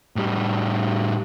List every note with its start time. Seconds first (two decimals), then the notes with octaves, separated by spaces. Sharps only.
0.16 A2 G3